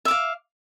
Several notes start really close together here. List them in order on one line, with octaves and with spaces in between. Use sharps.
E5 D6 F5